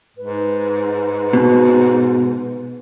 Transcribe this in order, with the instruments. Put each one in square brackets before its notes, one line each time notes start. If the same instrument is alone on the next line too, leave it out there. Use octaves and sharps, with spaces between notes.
[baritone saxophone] G#2 [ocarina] B4
[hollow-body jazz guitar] B2